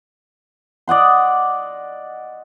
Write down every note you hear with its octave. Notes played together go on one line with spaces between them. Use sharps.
D5 D#5 F#5 C6